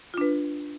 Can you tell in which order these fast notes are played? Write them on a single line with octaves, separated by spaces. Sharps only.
F4 D4 B4